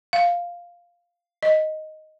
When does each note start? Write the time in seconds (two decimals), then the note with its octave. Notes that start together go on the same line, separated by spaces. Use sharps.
0.13 F5
1.43 D#5